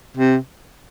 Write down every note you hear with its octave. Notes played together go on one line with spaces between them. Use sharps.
C3